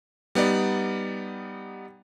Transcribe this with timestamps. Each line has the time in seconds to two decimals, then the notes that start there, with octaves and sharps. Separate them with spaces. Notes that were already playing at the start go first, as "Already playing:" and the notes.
0.35 G3 B3 D#4 D5